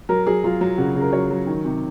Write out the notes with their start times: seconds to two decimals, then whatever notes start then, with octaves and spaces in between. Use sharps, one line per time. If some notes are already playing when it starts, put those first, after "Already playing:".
0.09 F#3 A#4
0.27 F#3 G#4
0.44 F#3 F4
0.61 F#3
0.78 C#3 F#4
0.95 C#3
1.01 A#4
1.13 F#3 C#5
1.31 F#3
1.47 D#3
1.65 C3